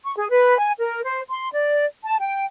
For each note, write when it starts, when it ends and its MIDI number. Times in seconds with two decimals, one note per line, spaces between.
0.04 0.13 85
0.18 0.29 68
0.31 0.57 71
0.58 0.73 80
0.78 1.02 70
1.03 1.21 72
1.29 1.49 84
1.53 1.85 74
2.04 2.16 81
2.20 2.45 79